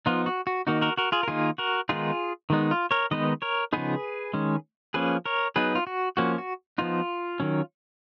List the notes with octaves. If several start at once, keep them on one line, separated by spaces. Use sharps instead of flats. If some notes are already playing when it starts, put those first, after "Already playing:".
F3 B3 D#4 F4
F#4
F#4
D#3 A#3 D#4 F#4
F#4 A#4
F#4 A#4
F4 G#4
A#4
D#3 A#3 D#4 F4 G#4
F#4 A#4
D#3 G#3 B3 D#4 F4 G#4
D#3 G#3 B3 D#4
F4
A#4 C#5
D#3 G#3 B3 D#4 B4 D#5
A#4 C#5
C#3 F3 B3 D#4 G#4 B4
D#3 G#3 C#4
F3 A#3 C#4 G#4 B4
A#4 C#5
F#3 B3 D#4 G#4 B4
F4
F#4
F3 A#3 C#4 F#4
F#4
F3 B3 D#4 F4
D#3 F#3 C#4